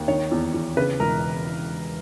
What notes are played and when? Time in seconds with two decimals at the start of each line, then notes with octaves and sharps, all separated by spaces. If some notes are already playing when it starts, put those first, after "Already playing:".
Already playing: D#2
0.08 D#3 C#5
0.31 E2
0.54 E2
0.77 C#3 B4
1.00 E1 A#4